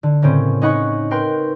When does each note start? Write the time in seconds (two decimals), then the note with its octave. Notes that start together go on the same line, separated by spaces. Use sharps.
0.03 D3
0.22 A2 C#3 A#3 C4 C#4
0.62 C#4 D#4 D#5 F#5 B5 C#6
1.11 A#4 B4 G5 C6